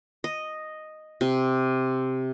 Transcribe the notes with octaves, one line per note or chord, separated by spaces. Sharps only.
D#5
C3